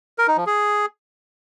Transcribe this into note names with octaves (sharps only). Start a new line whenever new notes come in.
A#4
D#4
F3
G#4